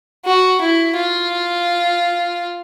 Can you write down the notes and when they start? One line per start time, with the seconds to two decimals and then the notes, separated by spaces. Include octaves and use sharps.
0.25 F#4
0.61 E4
0.97 F4